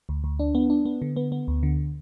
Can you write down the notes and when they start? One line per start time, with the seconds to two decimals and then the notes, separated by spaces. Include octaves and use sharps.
0.09 D2
0.24 D2
0.39 D4
0.55 B3
0.70 D4
0.85 B3
1.02 D3
1.16 B3
1.32 B3
1.48 D2
1.63 D3